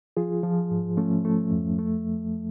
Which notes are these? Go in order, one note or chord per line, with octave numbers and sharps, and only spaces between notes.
F3 F4 G#4
F3
G#2
F3 A3 C#4
F3 A3
F2
A3